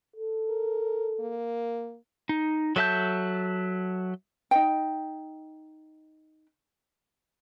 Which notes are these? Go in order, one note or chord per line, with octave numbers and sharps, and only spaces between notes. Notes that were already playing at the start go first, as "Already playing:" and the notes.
A4
A#4
A#3
D#4
F#3 A4 E5 A5 G6
D#4 D#5 G5